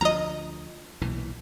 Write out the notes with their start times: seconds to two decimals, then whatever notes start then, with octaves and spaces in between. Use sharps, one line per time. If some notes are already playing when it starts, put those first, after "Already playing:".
0.01 D2 F3 D#5 A#5
1.02 B1 A#2 E3